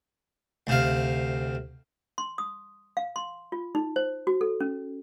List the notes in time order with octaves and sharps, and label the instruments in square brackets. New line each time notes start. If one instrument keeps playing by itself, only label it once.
[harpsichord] D2 C3 F5
[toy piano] C6
D#6
F5
C6
F4
D#4
C5
F#4
A4
C#4